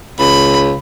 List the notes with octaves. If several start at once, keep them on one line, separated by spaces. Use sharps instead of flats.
C#2 B5